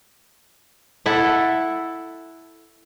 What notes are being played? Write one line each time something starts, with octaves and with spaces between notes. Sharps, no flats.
E4 A4 E5 F#5